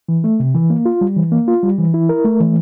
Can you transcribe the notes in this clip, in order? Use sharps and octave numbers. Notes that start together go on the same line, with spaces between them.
E3
A3
C3
E3
A#3
F4
G3
E3
A#3
F4
G3
E3
E4
A#4
A3
E3